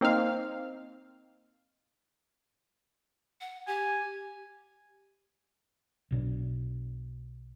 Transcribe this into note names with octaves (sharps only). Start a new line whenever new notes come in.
A#3 C4 D#4 F5
F#5
G4 G#5
B1 B2 D4